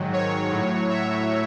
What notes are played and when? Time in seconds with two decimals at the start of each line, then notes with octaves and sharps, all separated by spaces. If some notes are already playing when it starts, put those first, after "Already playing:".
Already playing: G#2 D#3 F#3
0.13 C#5
0.51 A2 F#3
0.89 E5